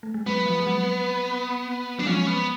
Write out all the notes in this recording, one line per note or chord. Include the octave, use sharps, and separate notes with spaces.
A3
G#3
F#3 B3
F3
G#3
F#3
F#3 D4
F3 G#3 C#4
B3